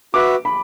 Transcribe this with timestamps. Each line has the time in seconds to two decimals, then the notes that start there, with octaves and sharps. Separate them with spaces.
0.14 F#4 B4 E5 D6
0.45 B5